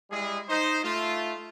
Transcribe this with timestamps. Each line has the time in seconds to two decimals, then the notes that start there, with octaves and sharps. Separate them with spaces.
0.11 G3 G#3 E4 G#4
0.49 D#4 C5
0.84 A3 F4